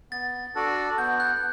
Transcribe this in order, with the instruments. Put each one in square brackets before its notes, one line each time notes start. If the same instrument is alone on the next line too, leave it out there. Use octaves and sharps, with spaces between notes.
[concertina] B3 [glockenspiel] A6
[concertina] D4 F#4 A4 D5
[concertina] B3 [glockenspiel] G6
[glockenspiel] F#6